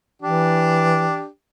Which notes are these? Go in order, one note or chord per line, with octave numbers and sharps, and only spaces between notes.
E3 D4 G4